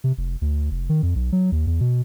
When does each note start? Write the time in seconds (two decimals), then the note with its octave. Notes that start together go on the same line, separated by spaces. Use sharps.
0.04 C3
0.17 F1
0.41 D2
0.71 F1
0.89 D#3
1.03 F2
1.15 B1
1.32 F#3
1.52 D#2
1.67 E2
1.80 B2